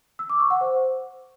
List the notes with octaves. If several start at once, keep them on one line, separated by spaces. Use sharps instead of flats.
E6
D6
C#6
F#5
C5